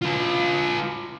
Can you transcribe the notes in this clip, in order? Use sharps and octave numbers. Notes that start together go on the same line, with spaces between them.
F4 B4